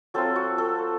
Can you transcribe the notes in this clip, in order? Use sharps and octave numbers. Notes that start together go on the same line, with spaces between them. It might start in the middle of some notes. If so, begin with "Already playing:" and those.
F#3 C4 F4 A4
F#4
A4